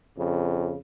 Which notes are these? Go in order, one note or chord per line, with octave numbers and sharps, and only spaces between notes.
F2 C#3